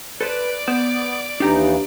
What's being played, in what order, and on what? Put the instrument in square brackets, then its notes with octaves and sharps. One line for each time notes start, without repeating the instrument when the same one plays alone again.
[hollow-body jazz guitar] A4 C5 [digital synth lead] B4 [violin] D5 D6
[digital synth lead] B3 [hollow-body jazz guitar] C5
[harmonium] D#2 E3 [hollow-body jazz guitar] D4 G4 A#5 [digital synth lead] D#4